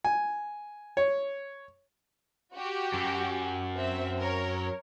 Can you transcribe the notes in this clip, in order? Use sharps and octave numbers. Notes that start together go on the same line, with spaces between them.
G#5
C#5
F#4 G4
F#2
C4 E5
A#4 C#5